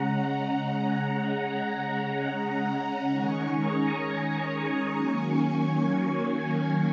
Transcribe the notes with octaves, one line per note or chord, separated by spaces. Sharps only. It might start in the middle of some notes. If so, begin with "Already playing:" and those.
Already playing: C#3 G#3 C#4 F#5 A#5
C#3 G#3 C#4
F#5 A#5
D#3 G#3 C#4 G#5 C#6
A#5 D#6
G#5 C#6
D#3 F#3 A#3 C#4